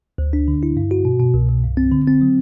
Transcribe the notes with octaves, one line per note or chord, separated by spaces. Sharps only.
D2
D4
D3
E4
G2
F#4
B2
B2
C2
C2
G2
C4
D3
C4
F#3